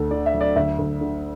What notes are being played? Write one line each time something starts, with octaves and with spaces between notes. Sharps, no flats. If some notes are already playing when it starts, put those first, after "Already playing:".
Already playing: D2 A3 A4
D3 D5
E5
F#3
D5
D2 E5
D2
D3